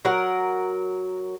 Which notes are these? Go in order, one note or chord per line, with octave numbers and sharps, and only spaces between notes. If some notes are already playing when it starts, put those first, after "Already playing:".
F#3 A#4 F#5 A#5